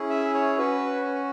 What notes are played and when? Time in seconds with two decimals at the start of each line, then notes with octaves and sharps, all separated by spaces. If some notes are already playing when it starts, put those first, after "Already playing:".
Already playing: C#4 E4 G#4
0.10 E5
0.34 C#5
0.58 C#4 F#4 B4